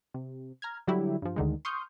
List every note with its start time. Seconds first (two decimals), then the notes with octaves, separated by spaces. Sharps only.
0.14 C3
0.62 A#5 F6 G#6
0.87 D3 F#3 G3 E4 G4
1.22 G2 F3
1.36 D2 D3 D#3 G#3
1.65 C6 C#6 D#6 F6 G6